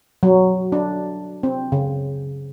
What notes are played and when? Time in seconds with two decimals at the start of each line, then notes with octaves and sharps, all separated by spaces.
0.23 F#3
0.72 D4
1.43 C4
1.72 C#3